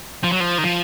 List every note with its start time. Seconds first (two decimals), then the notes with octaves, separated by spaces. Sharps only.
0.24 F3
0.33 F#3
0.41 F3
0.58 D#3
0.64 F3